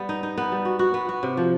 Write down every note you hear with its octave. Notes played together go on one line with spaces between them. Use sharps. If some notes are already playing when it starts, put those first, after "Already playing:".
Already playing: G3 B3
D#4
D#4
B3
G3
F#4
F#4
B3
F#4
C3
F3